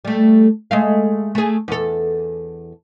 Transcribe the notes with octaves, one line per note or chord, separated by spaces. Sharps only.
G3 A3
G#3 A3 F5
A3 G#4
E2 A4